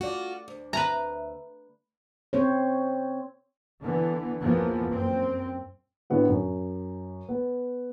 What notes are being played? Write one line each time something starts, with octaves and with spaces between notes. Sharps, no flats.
A3 F4 F#4 D5
D2
B4 E5 A#5
C4 C5 C#5
D3 E3 B3
A#1 E2 E3 F3 A#3 B3
F#2 C4
A2 D3 B3 F#4
F#2
B3